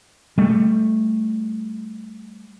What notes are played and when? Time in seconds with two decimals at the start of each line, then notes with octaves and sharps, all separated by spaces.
0.38 G3 A3